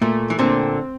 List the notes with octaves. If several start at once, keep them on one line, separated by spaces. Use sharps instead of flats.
A#2 A3
E3
A#2 D3 C4